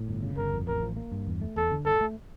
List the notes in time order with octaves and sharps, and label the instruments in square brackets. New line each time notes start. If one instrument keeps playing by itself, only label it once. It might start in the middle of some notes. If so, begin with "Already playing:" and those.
Already playing: [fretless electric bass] A2
G1
C#3
[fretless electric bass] G1 [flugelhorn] A#4
[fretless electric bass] F2
[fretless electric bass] A1 [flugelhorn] A#4
[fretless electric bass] F3
A#3
G2
E2
A3
[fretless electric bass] E2 [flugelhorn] A4
[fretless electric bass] D3
[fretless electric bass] G2 [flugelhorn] A4
[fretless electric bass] A3